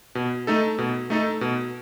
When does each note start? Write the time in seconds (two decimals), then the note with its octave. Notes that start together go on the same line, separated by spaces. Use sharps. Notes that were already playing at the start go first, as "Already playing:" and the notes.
0.15 B2
0.47 A3 D#4 A4
0.78 B2
1.10 A3 D#4 A4
1.41 B2